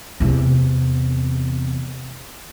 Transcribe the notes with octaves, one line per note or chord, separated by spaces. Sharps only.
E2 C3